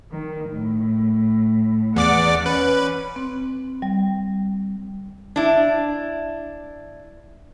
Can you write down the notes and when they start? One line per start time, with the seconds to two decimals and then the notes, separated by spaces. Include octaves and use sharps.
0.12 D#3
0.51 A2
1.96 E2 D5 F#5 D6
2.46 C#4 B4
3.16 C4
3.82 G3
5.36 D4 E4